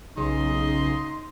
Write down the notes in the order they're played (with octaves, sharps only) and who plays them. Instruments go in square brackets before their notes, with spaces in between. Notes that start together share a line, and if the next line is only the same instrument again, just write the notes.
[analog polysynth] B1 C#3 [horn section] D#4 D#5 C6